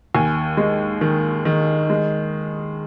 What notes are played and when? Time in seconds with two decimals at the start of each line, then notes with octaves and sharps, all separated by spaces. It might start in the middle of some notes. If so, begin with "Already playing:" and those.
0.14 D#2 G#5
0.57 G#3
1.01 D#3
1.45 D#3
1.90 G#3